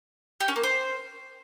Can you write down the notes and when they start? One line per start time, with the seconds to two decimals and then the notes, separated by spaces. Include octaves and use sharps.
0.40 G4
0.48 C#4
0.56 A#3
0.63 C5